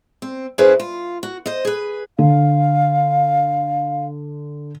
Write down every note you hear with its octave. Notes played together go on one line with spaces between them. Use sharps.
C4
G2 C#4 E4 G#4 B4 C5
F4
F#4
C5 D#5
G#4 B4
D3 F5